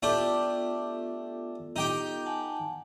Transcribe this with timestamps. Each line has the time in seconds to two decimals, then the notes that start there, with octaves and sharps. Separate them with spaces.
0.03 A3 B3 D4 F4 G4 A4
1.76 D#4 G4 G5
2.26 F#5 G#5 A5